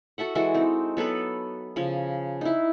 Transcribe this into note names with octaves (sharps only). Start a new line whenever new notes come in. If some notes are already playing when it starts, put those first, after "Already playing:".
F#4 A4 E5 F#5
E3 G#3 F#4 A4
C4 D#4
F#3 B3 A4 B4
C#3 F3
D#4 E4